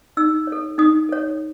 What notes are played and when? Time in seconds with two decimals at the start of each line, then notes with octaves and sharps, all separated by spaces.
0.17 D#4 E6
0.47 A4 C#5
0.78 D#4 D#6
1.09 A4 C#5